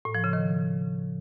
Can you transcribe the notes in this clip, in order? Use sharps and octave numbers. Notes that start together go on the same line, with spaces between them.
A2
F3
C#3
D#3